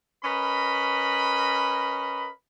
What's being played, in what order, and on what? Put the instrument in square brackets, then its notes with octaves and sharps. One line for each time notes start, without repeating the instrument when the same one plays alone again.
[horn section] C#4 A#4 B4 D#5 B5